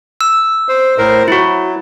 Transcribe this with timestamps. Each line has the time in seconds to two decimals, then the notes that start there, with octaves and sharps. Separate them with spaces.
0.21 E6
0.69 C5
0.98 A2 A#4 C5
1.28 F#3 E4 F#4